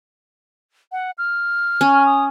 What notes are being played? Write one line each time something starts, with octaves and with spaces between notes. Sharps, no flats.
F#5
F6
C#4
D#6